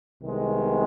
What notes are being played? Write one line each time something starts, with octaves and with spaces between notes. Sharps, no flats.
C2 C3 D#3 G#3 B3